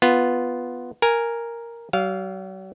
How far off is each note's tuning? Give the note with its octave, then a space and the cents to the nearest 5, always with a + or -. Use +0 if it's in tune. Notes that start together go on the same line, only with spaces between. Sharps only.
B3 +0 F4 +0
A#4 +0 G#5 +0
F#3 +45 F5 +0